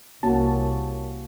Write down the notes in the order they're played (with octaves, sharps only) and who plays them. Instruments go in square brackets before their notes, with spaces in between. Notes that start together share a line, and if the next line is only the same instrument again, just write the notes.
[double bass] C2 [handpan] A#3 C#4 F#4 [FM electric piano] A5